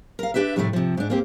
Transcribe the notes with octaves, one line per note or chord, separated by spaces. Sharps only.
A#4 F5
D4 G4 B4 E5
F2 A2 C3 G#3 A3
C3 F3
G#2 D4
A#3 C4 G4